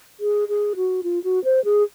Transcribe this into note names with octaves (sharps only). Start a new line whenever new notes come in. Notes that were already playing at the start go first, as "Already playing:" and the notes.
G#4
G#4
F#4
F4
F#4
C5
G#4